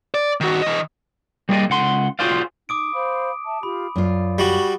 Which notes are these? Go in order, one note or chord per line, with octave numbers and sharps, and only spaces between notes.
D5
D#3 F#4
E3 D#5
G3 A#3 G#4 B4 D5 D#5
C#2 F#5 C6
F4 F#4 G#4 C5 D5 F5
D#4 D6 D#6 D7
C5 F5 B5
E5 A5
F4 G4 B5
F#2 F4 D5
G3 F#4 C#6